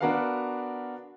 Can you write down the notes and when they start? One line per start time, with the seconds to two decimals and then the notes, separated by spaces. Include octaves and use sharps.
0.01 B3 D4 F#4 A#4 B4 F5